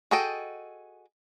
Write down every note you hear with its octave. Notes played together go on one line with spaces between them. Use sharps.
F#4 G#4 A4 D#5 G5